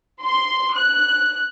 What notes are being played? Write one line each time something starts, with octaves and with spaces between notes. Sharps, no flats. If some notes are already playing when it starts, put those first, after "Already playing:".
C6
F#6